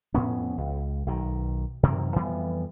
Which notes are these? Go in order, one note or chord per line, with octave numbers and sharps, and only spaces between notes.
F2 A2 B3 C#4
C#2
B1 D#3
F#2 C3 D#3 E3
F2 E3 G3 B3